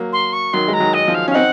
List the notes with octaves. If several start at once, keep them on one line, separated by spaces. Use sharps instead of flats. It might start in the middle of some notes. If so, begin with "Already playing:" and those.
Already playing: F#3 A#3
C6
C#6
D#3 F#3 C6
G#3
A#5
D#3 F#3
D#5
F3
F5
C#4
F5
C4 D#4 F#5